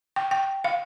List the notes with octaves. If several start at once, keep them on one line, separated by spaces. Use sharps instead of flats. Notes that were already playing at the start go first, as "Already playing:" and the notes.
G5
G5
F5